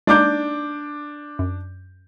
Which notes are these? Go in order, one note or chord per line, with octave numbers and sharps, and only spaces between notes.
G#3 A#3 D4 D#4 D6 G6
F#2